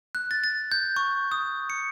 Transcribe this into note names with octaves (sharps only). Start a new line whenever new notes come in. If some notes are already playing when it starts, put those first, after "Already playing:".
F#6
A6
A6
G6
C#6
D#6
C#7